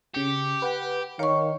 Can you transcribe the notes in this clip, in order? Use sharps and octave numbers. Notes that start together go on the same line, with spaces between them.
C#3 G4 C#7
B4 F#5 G5
D#3 A#4 C#5 F5 C#6